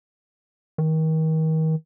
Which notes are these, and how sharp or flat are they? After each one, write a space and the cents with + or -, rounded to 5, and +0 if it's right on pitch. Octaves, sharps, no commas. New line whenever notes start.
D#3 +35